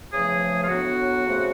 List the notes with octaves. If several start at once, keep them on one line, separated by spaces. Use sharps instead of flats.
E2 C#3 F3 A3 G#4
F4
A2 F#3 B3 D4 F#4
F2 C#3 F3 A3